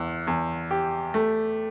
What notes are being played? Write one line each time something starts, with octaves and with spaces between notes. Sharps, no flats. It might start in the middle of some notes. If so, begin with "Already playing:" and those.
Already playing: E2
E2
G4
A3